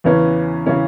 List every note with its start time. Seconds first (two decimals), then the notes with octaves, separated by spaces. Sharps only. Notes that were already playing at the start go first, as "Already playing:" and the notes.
0.04 E2 C#3 E3 C#4
0.66 C#3 E3 C#4